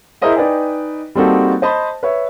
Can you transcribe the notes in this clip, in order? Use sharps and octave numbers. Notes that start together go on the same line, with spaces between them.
E4 G#4 A#4 C5 D#5 E5
D#4 B4 D5 D#5 G5 G#5
G3 A#3 C4 D#4 F#4 A4
C5 D#5 A5 B5
B4 C#5 E5